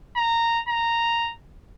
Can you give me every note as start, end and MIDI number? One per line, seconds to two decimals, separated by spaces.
0.16 0.60 82
0.69 1.33 82